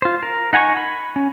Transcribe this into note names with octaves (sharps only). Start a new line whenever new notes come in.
F4 C5
A#4
D#4 F#5 G#5 A#5 C#6
B5
C#4